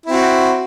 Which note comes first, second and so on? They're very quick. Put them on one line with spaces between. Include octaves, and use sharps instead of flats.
E4 C4 F#4